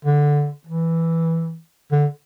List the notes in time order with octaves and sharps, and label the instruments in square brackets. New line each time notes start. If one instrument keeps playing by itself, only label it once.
[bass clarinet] D3
E3
D3